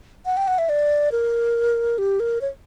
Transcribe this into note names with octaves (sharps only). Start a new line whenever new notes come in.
F#5
G5
F#5
E5
D5
A#4
G4
A#4
C#5